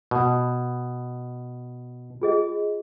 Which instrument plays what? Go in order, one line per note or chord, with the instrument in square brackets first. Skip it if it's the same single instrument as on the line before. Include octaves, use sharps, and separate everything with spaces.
[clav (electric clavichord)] B2
[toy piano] F4 G#4 D#5